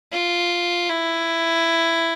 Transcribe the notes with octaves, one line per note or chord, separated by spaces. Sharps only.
F4
E4